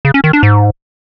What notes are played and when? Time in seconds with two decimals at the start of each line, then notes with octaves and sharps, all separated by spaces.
0.05 C#3
0.14 C#4
0.24 D#3
0.33 D4
0.43 G#2